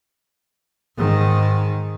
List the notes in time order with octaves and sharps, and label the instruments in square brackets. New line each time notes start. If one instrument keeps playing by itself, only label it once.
[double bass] G#2 D#3